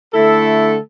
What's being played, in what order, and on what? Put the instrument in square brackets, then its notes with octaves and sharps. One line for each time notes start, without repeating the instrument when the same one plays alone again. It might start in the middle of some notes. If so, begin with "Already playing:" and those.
[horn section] D3 A3 E4 A4